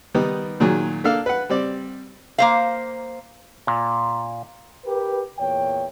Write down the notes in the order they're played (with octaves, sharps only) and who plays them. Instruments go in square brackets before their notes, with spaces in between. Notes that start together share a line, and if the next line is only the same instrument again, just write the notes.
[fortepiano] D#3 G3 B3 D#4
A#2 D#3 F#3 G#4
A#3 D4 A4 F5
B4 F#5
G3 C4 D5
[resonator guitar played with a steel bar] A#3 C5 F5
[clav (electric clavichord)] A#2
[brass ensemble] G4 A#4 B4
E2 A#2 C#5 G5